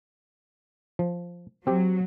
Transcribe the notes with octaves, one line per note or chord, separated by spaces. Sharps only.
F3
F#3 C4 G4